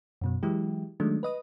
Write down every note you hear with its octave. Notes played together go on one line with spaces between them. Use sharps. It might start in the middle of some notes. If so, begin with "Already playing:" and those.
F#2 B2 F#3
E3 F#3 G#3 E4 G4
D#3 F#3 G#3 A3 D4
B4 D#5 D#6